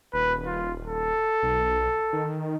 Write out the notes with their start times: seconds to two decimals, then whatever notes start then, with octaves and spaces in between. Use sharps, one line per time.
0.13 D#1 B4
0.46 F4
0.86 A4
1.43 B1
2.13 D#3